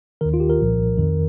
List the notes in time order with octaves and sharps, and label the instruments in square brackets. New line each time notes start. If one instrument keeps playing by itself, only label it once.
[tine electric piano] D#2 D#3 A#4
F4
G4
A#4
C2 A#2 F3
F2 D#3